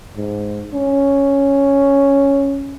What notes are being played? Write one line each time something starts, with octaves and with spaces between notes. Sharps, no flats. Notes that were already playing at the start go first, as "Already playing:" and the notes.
G#2
C#4